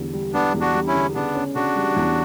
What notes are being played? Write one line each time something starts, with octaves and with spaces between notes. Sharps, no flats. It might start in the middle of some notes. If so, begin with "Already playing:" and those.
Already playing: E2 D3 G3
G3
G3 B3 D4
E2
D4 F#4
G3
C#4 E4
D3
C#3 B3 D4
C#4
C#3 D4 F#4
G3
E2